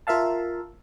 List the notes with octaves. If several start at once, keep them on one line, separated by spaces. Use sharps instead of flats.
F4 A#4 E5 F5 A5